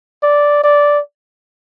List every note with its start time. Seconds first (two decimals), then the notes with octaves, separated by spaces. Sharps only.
0.23 D5
0.64 D5